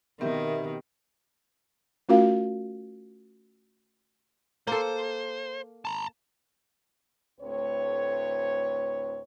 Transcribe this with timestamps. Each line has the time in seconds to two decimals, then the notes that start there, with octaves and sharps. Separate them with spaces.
0.21 B2 D#3 B3 C4 G4 A#4 E5
2.09 A3 C#4 F4 F#4 A#4 F5
4.67 A#3 A4 C5
5.85 A5 A#5
7.40 D2 A2 C4 B4 C#5